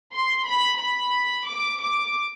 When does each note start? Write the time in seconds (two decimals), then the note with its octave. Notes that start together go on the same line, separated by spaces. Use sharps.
0.14 C6
0.48 B5
0.81 B5
1.49 D6
1.82 D6